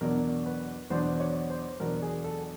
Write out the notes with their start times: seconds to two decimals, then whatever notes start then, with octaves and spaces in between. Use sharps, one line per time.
0.01 E2 B2 F#3 B3 D4 A#4
0.46 B4
0.90 E2 B2 F#3 B3 D4 C5
1.20 C#5
1.50 C5
1.80 E2 B2 F#3 B3 D4 A#4
2.02 G#4
2.24 A4